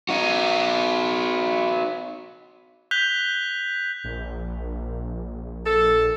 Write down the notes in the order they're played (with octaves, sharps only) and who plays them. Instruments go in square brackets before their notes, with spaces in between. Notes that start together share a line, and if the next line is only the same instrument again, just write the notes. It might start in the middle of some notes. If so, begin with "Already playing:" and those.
[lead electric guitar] D#4 F#4
[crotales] F#6 G6 B6 F7 G7
[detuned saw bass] A#1
[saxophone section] A4